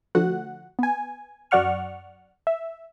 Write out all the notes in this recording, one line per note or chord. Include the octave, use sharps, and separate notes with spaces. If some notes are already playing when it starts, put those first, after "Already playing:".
D3 F3 A3 F#4 F#5
B3 G#5
F#2 F#4 D5 F#5 C#6 F6
E5